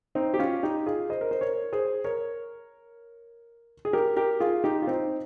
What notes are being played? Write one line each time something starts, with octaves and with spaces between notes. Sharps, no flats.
C4 D#4
G4
C#4 F4
D#4 G4
F4 G#4
C5 D#5
A#4
C5
A#4 C#5
G#4 C5
A#4 C#5
G#4
G4 A#4
G4 A#4
F4 G#4
D#4 G4
F4
C4 D#4